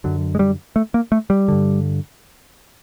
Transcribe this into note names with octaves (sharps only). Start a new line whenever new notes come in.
F#2 D3 F#3
G#3
G3
A3
A#3
A3
G3
G2 D3